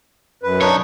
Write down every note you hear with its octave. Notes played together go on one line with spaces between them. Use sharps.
F#2 B4
B1 D4 D#4 C#5